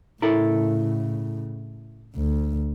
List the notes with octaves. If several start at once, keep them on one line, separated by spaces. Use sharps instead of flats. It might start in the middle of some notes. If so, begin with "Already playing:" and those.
A2 C#3 E4 A4 A#4
D2